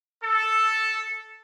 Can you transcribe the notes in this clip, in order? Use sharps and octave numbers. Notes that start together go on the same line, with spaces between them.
A4